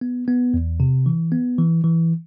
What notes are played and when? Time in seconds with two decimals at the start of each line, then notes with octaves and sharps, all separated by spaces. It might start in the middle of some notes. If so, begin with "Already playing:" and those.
0.01 B3
0.28 B3
0.54 E2
0.80 C3
1.06 E3
1.32 B3
1.58 E3
1.84 E3